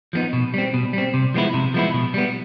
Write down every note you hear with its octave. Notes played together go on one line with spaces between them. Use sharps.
F3 G#3 B3 D#4
B2
G3 C4
B2
G3 C4
C3
F3 G#3 B3 E4
C3
F3 G#3 B3 E4
B2
G3 B3